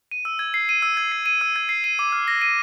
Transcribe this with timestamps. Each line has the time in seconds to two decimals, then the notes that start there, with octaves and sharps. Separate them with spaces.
0.11 D#7
0.25 E6
0.39 G#6
0.54 C7
0.69 D#7
0.82 E6
0.97 G#6
1.12 C7
1.26 D#7
1.41 E6
1.56 G#6
1.69 C7
1.84 D#7
1.99 D6
2.12 F6
2.28 A#6
2.42 D#7